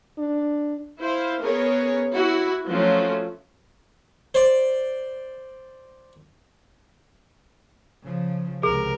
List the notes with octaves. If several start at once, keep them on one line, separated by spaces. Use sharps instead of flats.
D4
E4 C5 F5
B3 C#4 G#4 A#4 C#5
E4 F#4
F3 F#3 A3 C#4 F4
C5 D5
C#3 F3
C#2 C3 G#4 A#4